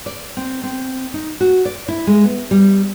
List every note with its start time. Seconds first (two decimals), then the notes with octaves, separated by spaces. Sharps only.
0.06 D5
0.37 C4
0.63 C4
1.14 D#4
1.40 F#4
1.65 D5
1.88 E4
2.07 G#3
2.24 B3
2.51 G3